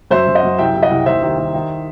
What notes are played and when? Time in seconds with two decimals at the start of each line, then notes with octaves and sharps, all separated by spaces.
0.11 F#2 C5 E5
0.27 F#2
0.35 D#5 F#5
0.43 F#2
0.58 C2 E5 G5
0.75 C2
0.82 D#5 F#5
0.90 C2
1.06 D#2 C5 E5
1.22 D#3
1.38 D#3
1.54 D#3